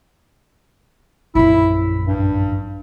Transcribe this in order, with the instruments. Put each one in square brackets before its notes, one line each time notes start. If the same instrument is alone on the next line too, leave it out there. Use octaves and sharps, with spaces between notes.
[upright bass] A#1 F#2 [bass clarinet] E4
[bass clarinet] G2